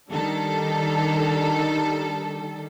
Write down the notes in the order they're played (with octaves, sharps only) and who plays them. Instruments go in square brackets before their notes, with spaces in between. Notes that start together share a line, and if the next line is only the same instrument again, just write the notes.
[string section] D#3 G3 D4 A4